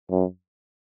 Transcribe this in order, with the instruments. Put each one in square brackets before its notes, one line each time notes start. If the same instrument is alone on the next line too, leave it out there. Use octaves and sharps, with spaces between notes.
[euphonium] F#2